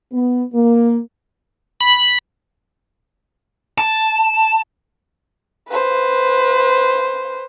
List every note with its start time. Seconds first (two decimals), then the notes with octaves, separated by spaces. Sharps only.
0.12 B3
0.53 A#3
1.81 B5
3.78 A5
5.69 B4 C5